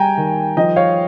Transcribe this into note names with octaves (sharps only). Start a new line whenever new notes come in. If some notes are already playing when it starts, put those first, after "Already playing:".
Already playing: G3 G5 G#5 A#5
D#3
F3 D#5 G5
C#5 F5